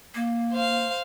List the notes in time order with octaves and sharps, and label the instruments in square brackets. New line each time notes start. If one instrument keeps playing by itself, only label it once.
[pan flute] A#3
[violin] C5 F5